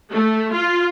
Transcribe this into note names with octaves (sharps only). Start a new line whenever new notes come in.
A3
F4